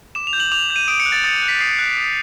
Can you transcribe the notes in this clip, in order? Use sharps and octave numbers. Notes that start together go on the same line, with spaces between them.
D6 E7
F7
G6
F#7
D6 F7
G6
D#7
D#6 D7
C#7
F#6
A6
D#6 A6
F#6
B6
D#6 C7
F#6
D#6